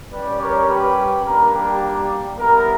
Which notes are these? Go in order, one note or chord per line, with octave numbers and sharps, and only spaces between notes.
G3 C#4 G4 B4 D5
A#4 C#5
G4 B4
G3 A#3 D4 A#4
G4
G4
G3 B3 E4 A#4